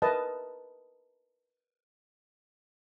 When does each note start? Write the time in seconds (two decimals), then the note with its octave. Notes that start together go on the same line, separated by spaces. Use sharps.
0.02 A#4 B4 D#5 E5 A5